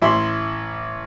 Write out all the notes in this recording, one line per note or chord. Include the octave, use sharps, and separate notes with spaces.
A1 E4 B5 C6